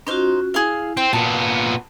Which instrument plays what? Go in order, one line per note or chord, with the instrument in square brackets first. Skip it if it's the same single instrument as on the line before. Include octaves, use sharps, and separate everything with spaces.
[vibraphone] C#4 F4 F#4 [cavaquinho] D#4 C5
[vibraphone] E4 [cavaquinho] G#4 F5
[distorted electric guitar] C4 [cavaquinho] G5
[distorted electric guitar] A#2 B3 [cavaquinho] A5 [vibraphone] A#5